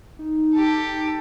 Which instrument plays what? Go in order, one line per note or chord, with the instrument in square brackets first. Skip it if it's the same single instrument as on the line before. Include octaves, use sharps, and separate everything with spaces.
[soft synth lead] D#4
[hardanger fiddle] G4 A4